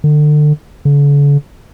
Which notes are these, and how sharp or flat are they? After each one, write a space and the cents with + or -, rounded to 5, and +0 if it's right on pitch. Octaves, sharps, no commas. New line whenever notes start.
D3 +30
D3 -45